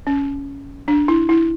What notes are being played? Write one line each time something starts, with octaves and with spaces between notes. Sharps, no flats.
C#4
D4
E4
E4